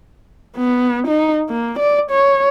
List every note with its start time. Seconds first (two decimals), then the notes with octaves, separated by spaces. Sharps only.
0.57 B3
1.07 D#4
1.49 A#3
1.79 D5
2.11 C#5